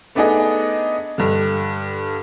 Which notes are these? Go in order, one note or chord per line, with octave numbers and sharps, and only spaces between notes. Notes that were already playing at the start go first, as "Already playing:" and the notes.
A3 B3 D4 D#4 G#4 D#5
G2 D3